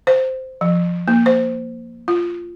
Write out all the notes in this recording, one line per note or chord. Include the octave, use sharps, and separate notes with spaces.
C5
F3
A#3
C5
F4